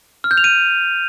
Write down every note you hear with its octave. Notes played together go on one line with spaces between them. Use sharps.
F6
G6
F7
D#7